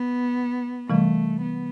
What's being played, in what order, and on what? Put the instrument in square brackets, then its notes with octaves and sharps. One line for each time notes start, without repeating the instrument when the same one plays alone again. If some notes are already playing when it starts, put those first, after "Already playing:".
Already playing: [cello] B3
[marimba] C3 E3 G3 [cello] A3
[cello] B3